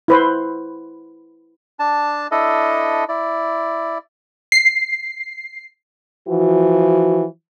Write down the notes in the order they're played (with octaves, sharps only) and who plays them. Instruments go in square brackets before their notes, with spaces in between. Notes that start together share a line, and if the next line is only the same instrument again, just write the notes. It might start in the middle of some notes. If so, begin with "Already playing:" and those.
[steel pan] E4 B4 C5
[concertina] D4 A5
D4 E4 A4 D#5
E4 D5
[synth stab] C7
[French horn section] E3 F3 F#4